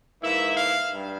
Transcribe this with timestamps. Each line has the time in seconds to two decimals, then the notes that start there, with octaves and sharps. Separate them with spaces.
0.22 G#2 E3 A#3 E4 E5
0.56 F5
0.90 G2